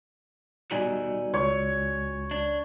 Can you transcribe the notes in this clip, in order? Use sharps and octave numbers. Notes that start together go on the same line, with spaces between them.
B2 G3 D#4 F#4 D5 G#5
C#2 C#5
D4